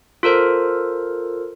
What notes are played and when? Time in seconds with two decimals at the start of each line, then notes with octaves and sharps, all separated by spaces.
0.23 F4 A4 A#4 C5